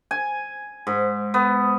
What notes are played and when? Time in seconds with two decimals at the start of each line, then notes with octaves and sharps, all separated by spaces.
0.11 G#5
0.87 G#2
1.34 B3